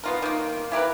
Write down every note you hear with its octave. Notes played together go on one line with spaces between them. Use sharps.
B3 F4 A#4
D#3 A#3
E4 G4 A#4 B4